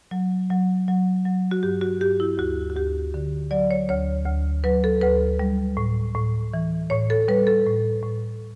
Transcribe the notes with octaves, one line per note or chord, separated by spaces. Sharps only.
F#3
F#3
F#3
F#3
F#4
G2 G4
F#4
G2 G4
E4
D2 F#4
F#4
D2 G4
D3
F#3 D5
C#5
D2 C#5
D2
F#3 B4
A4
D2 B4
G3
A2
A2
E3
A2 C#5
A4
G3 B4
A4
A2
A2